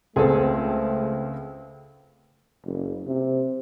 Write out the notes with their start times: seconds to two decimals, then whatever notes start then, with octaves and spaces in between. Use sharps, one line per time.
0.16 C#2 A3 C4 G#4 A4
2.65 F#1
3.07 C3